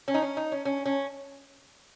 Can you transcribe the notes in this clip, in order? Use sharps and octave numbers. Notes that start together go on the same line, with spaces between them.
C#4
D#4
C#4
D#4
C#4
C#4
C#4